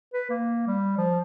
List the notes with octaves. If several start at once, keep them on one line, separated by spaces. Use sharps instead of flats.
B4
A#3
G3
F3